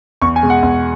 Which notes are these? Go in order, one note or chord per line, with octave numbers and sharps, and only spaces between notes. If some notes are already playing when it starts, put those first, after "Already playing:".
E2 C#6
G#5
B2 G#3
F#5
E2